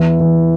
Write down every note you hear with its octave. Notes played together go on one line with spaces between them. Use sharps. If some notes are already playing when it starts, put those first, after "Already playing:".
Already playing: E2 E3
E3